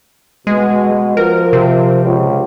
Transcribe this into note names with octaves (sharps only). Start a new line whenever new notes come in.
B2 G#3
F3 A#4
C3
C#2